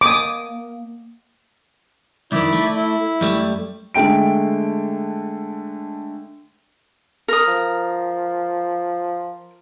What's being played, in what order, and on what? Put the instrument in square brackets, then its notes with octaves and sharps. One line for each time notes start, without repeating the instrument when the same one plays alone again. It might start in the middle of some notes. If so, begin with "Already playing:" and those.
[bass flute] A#3 [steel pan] D6 D#6
[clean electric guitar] C2 F2 D#3 [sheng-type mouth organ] E4 D5 B5
[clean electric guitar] A3
[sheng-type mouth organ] E4
[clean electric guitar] F#2 G3 A3
[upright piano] D3 G#3 A3 G5 D7
[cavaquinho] A#4 D#6
[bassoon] F3